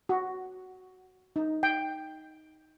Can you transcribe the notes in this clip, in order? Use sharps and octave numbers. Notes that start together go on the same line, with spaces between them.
F#4
D#4
G5